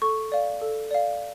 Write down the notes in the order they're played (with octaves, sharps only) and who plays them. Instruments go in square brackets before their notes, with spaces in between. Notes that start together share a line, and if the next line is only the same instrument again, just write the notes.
[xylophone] A4 C#6
D5 F5
A4
D5 F5